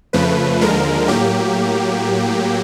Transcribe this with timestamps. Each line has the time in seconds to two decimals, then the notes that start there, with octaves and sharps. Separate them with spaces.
0.13 F2 C#3 F3 A3 B4
0.61 D#2 D3 F3 G#3 A#4
1.08 A2 F#3 A#3 G4